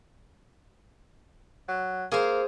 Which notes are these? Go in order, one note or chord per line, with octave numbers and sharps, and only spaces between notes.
F#3
A#3 G#4 C5